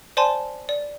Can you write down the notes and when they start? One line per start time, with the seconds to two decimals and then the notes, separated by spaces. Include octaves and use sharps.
0.17 C5 D5 G#5 A5 C6
0.69 D5